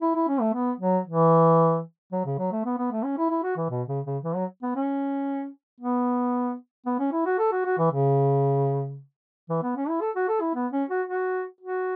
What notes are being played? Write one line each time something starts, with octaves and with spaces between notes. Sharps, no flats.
E4
E4
C#4
A3
B3
F#3
E3
F#3
C#3
F#3
A3
B3
B3
A3
C#4
E4
E4
F#4
E3
B2
C#3
C#3
E3
F#3
B3
C#4
B3
B3
C#4
E4
F#4
A4
F#4
F#4
E3
C#3
E3
B3
C#4
E4
A4
F#4
A4
E4
B3
C#4
F#4
F#4
F#4